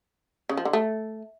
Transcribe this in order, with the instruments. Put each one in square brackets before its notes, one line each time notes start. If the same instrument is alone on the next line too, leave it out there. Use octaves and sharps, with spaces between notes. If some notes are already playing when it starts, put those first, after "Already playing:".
[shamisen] C#3
F3
D3
A3